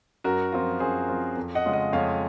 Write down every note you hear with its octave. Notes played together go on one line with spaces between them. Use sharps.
F#2 F#4 A#4
F3 C4 F4
F#2 G#4 C5
F3 C4 F4
F2
D#5 F#5
C#3 G#3 C#4 F4
D#5 F#5
F2 C#5 F5